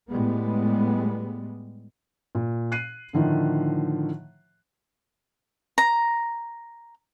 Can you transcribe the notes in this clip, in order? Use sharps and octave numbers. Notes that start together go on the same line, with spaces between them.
A2 G3 G#3 B3
A#2
F#6 C7 D#7
A2 D3 D#3 F3
A#5